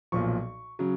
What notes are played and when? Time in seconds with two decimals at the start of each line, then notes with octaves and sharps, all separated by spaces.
0.12 B1 A#2 F3 C#6
0.79 C#3 F#3